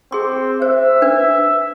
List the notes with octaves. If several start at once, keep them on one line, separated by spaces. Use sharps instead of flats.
C4 G#4 C6
C5 E5
D4 B4